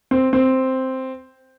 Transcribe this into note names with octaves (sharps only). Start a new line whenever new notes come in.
C4
C4